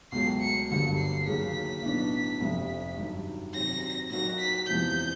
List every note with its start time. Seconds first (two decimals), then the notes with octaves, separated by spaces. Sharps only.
0.12 C#2 B2 F#3 A3 C7
0.41 C#7
0.69 G1 G2 D3 F#3 A#3 C#7
0.97 C7
1.26 D#2 C#3 F#3 A#3 B6
1.82 B1 A2 F#3 B3 D4
2.40 F1 F2 C3
2.97 G2 D#3 F#3
3.54 C3 D#3 F#3 A#6
4.10 A#2 F#3 A#3 D#4 F#4 A#6
4.40 B6
4.68 E2 C3 F3 G6